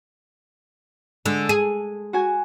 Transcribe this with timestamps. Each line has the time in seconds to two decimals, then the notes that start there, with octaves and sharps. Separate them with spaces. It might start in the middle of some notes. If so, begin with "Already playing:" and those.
1.26 D3 G#3
1.49 G#4
2.13 F#4 G#5